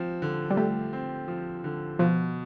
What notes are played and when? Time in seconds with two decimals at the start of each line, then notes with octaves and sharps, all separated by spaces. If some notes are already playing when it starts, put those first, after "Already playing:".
Already playing: F3 C4
0.22 D3
0.50 G3
0.57 A3 G4
0.93 C4
1.28 F3
1.64 D3
1.99 B2 F3